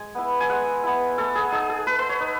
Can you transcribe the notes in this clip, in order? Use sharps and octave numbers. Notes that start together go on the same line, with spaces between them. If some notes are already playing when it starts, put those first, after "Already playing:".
Already playing: G#3 G#5
B3 E4
G#5
G#3 F#5
B3 E4
A3 A4
G#4
D#4 G#4
A4
A3 B4
B4
C#5
D#4